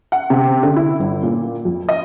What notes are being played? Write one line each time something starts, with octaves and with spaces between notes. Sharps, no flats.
F#5
C3
D3
E4
G1
A#2
F2
D#5